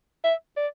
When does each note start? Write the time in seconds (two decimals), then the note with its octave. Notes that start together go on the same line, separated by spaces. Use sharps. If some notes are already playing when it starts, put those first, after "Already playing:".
0.24 E5
0.57 D5